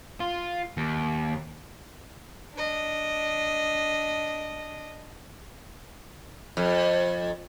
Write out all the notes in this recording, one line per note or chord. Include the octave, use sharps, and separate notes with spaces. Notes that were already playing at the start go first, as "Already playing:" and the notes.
F4
D#2
D4 D#5
F2